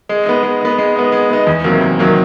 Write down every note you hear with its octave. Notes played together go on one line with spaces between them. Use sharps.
G#3
B3 D#4
G#3
B3 D#4
G#3
B3 D#4
G#3
B3 D#4
E2
C3 D#3 F#3 A#3
E2
C3 D#3 F#3 A#3